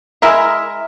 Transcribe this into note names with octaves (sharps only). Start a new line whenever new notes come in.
G#3 E4 A#4 E5